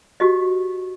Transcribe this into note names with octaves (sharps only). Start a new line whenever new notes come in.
F#4 G4 D#5